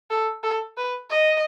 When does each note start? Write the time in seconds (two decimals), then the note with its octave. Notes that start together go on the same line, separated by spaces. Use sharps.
0.10 A4
0.43 A4
0.77 B4
1.10 D#5